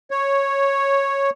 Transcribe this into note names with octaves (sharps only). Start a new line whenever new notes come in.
C#5